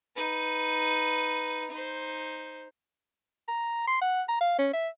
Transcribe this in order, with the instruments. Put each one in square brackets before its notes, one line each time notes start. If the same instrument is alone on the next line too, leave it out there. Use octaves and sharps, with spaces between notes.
[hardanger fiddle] D#4 B4
D#4 C5
[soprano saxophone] A#5
C6
F#5
A#5
F5
C#4
E5